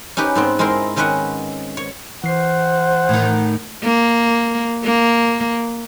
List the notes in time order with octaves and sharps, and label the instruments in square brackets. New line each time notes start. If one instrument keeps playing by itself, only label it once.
[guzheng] C#4 D#4 G4 B4
G#2 B3 C4
G#3 C4 E4 A#4 C5
D#3 C4 C#4 B4 D#5 F#5
C#5
[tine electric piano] E3 C7 [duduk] C5 [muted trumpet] F#5
[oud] A2 D#3
[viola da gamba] A#3
A#3